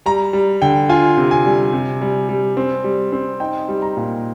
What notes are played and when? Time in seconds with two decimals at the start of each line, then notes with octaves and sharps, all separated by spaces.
0.06 G3 A#5
0.33 G3
0.62 D3 G5
0.89 F4 G#5
1.17 C3
1.31 G#5
1.46 G3
1.73 C3
2.02 G3
2.29 G3
2.57 C4
2.84 G3
3.12 C4
3.40 D#4 G5
3.68 G3
3.82 A#5
3.97 A#2